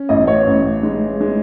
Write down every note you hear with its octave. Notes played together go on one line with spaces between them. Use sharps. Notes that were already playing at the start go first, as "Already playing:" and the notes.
Already playing: C#4
A1 D#5
C#5
A1
G#3
G#3